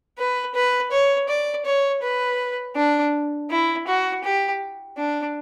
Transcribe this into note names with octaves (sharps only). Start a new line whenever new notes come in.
B4
B4
C#5
D5
C#5
B4
D4
E4
F#4
G4
D4